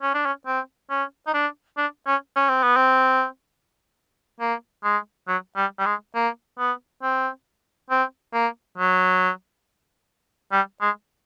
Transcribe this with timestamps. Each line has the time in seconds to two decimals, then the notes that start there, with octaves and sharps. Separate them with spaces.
0.02 C#4
0.14 D4
0.26 C#4
0.47 C4
0.90 C#4
1.27 D#4
1.34 D4
1.78 D4
2.07 C#4
2.36 C#4
2.49 C4
2.63 B3
2.76 C4
4.40 A#3
4.84 G#3
5.28 F#3
5.57 G3
5.79 G3
5.86 G#3
6.15 A#3
6.59 B3
7.02 C4
7.90 C4
8.34 A#3
8.78 F#3
10.52 G3
10.82 G#3